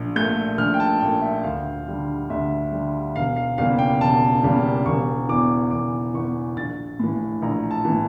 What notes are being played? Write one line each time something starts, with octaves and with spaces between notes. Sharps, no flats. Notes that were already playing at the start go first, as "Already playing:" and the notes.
Already playing: A#1
A#2 A3 G6
A#1 F6
G5
A5
A#2 A3 G5
E5
D2 F5
D3 G3
D2 E5
D3 G3
E1 F5
F5
E2 C#3 G3 A#3 F5
G5
E1 A5
E2 C#3 G3 A#3
E1 C#6
E2 E3 D6
E1 D6
E2 E3 C#6
A#1 A6
A2 E3
A#1 A#5
A5
A2 E3